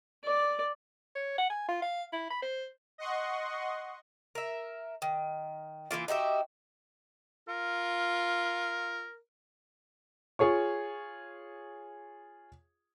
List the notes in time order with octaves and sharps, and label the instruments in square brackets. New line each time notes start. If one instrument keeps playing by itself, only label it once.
[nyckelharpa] D5
[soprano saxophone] C#5
F#5
G#5
F4
F5
E4
B5
C5
[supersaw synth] D#5 F#5 C6 C#6
[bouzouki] A#4 E5
D#3
E3 F3 A#3 F4
D#4 F#4 G4 E5
[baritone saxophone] F4 [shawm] A#4
[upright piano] F4 G#4 C#5 C#6